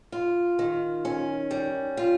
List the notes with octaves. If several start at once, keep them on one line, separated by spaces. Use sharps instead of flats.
F4
D#3
C#4
G3
F4